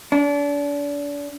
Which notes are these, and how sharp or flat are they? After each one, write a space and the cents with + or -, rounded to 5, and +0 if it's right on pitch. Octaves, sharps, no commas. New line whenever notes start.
D4 -35